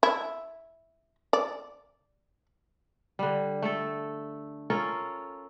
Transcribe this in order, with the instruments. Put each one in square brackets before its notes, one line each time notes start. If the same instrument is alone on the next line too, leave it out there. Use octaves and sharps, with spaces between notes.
[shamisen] E4
D5
[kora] D3 G3
A3 A4
C#4 F4 A4 A#4